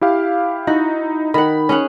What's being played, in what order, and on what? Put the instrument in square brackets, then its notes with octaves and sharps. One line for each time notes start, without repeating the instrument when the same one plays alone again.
[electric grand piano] E4 G4 F5
[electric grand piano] D#4 E4 [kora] F#4
[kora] D#3 F#5 [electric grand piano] B5
[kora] C#4 G#4 F#5